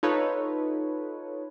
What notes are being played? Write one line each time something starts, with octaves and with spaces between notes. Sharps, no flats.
D#4 F4 A4 B4 C#5